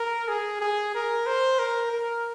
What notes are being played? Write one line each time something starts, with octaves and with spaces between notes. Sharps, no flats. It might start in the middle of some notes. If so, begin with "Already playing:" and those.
Already playing: A#4
G#4
G#4
A#4
C5
A#4
A#4